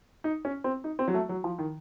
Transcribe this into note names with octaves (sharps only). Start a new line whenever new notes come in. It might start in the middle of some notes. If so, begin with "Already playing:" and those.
D#4
C#4
C4
D#4
C4
F#3
A3
F#3
F3
D#3